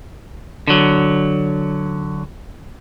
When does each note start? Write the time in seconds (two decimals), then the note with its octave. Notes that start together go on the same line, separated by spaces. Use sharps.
0.68 D3 F#3